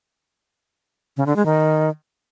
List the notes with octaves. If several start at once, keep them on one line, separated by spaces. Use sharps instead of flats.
C#3
D3
G#3
D#3